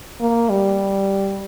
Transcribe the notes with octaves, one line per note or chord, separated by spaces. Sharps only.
A#3
G3